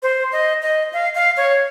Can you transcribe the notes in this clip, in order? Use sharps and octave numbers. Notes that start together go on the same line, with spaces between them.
C5
D#5
D#5
F5
F5
C#5